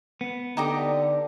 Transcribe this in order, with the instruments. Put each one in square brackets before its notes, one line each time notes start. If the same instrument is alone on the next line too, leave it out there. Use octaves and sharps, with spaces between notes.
[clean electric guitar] B3
[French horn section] D3 [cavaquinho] D#4 G4 A#5